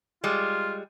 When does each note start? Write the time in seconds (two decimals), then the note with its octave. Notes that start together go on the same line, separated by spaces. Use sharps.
0.24 G3 G#3 F4